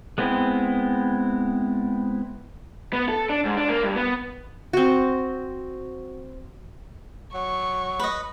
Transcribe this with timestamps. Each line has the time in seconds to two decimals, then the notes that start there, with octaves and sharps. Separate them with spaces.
0.18 G#3 B3 C4 E4
2.93 B3
3.09 A4
3.29 D4
3.45 G#2
3.57 D4
3.69 A#3
3.83 G2
3.96 B3
4.73 C4 F#4
7.34 F#3 C#6
8.00 B4 D#5